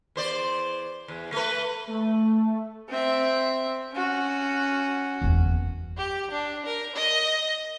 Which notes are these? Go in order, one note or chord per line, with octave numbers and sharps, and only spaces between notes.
E2 C5 D5
E2
A3 B4
A3
C4 E5
C#4 F#4
F#1 E2
G4
D4
A#4
D#5